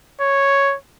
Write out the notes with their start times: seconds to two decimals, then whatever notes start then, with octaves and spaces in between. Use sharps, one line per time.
0.21 C#5